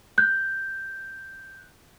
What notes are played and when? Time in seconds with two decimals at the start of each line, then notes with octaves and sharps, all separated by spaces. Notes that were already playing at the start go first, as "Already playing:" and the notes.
0.18 F#6 G6